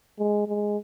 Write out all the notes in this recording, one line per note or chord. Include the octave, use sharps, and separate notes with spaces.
G#3
G#3